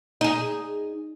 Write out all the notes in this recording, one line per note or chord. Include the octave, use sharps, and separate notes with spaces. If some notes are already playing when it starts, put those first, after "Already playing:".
D#4 G#4